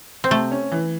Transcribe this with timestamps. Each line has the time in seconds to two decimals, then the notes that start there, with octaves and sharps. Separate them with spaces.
0.24 C4
0.30 C3 A3
0.51 C#4
0.72 E3